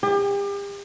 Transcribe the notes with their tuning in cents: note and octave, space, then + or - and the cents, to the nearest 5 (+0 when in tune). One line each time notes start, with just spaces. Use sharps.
G4 +40